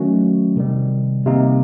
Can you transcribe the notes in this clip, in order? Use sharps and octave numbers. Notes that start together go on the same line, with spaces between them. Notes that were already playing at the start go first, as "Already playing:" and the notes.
Already playing: D#3 F#3 A3 C#4 F#4
C3 D#3 G3
C3 D#3 G3 A#3 D#4